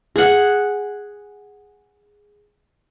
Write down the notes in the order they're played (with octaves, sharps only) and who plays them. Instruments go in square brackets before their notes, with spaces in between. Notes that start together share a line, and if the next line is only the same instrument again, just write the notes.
[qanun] G#4 F#5